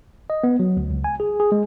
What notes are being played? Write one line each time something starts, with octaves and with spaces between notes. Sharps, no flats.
D#5
B3
F#3
D2
C#2
G#5
G#4
G#4
G#3